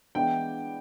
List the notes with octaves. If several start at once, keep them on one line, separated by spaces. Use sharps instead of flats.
E3 G#3 B3 D4 G5